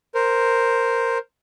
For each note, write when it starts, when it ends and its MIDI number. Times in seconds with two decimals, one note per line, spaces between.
0.15 1.18 70
0.15 1.18 72